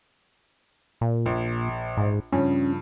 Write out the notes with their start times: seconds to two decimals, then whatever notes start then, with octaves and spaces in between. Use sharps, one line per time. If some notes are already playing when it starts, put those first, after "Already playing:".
1.01 A#2
1.26 A#1
1.97 G#2
2.32 G2 C#3 F3 C#4